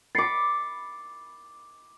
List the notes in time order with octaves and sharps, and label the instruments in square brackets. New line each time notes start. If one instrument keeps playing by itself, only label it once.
[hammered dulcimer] B5 D6 [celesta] A6 C7 C#7